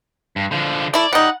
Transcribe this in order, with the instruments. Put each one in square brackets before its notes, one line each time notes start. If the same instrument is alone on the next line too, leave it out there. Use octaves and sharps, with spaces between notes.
[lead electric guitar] G2
D3 F3
[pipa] A3 E4 [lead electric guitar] D5
[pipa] G3 D#4 [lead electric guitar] F#5